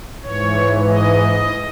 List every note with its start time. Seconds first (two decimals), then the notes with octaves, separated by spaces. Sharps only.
0.23 G#2 E3 C#5
0.88 D#5